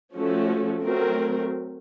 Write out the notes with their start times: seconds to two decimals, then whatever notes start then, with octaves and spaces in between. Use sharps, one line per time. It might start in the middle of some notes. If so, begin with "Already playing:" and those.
0.14 F3 A3 C#4 F#4 A4
0.82 F#3 A3 C4 F#4 A#4